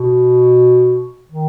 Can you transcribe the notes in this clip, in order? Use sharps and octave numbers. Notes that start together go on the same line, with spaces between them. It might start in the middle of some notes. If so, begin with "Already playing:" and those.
Already playing: B2
D#3